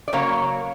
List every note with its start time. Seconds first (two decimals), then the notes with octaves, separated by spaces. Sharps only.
0.08 D5
0.13 C#3 F#3 A#3 C#5